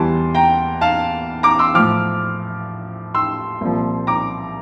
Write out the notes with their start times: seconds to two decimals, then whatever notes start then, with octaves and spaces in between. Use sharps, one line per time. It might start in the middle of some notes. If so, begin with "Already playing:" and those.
Already playing: E2 E3 G3 A5 C6
0.35 G5 A#5
0.81 F5 A5
1.43 A#5 D6
1.59 C6 E6
1.74 A2 F3 D6 F6
3.14 C6 E6
3.61 C2 A#2 F3
4.07 A#5 D6